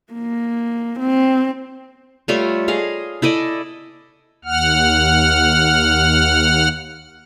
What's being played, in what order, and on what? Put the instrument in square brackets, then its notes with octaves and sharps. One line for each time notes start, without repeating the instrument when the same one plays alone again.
[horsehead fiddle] A#3
C4
[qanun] G3 A3 F4 C#5
G#4 D#5 F5
E4 A4 D5 D#5
[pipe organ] D#2 F#5 F6